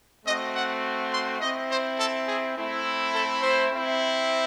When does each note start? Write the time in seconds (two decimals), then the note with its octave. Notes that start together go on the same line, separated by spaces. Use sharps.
0.25 A3 C4 F#4 D#5
0.54 F#5
1.12 C6
1.40 C4 E4 D#5
1.69 C5
1.98 A4
2.27 G#4
2.56 A3 C4 E4
3.14 A4
3.42 C5
3.72 C4 E4